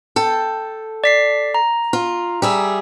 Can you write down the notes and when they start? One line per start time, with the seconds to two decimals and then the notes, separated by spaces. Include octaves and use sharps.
0.16 A4 G5
1.04 D5 B6 C7
1.54 A#5
1.93 F4
2.42 G3 G#4 E5